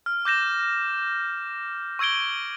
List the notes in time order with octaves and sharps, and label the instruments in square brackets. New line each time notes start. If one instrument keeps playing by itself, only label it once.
[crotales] F6
D6 G6 A#6 E7
C#6 E6 G#6 D7 G7